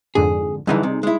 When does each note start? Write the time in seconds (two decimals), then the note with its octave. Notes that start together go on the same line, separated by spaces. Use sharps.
0.15 F2 G#2 D3 G#4
0.67 F#2 D3 E3 G3 D#4 G#4
0.83 C3
1.03 G#3 E4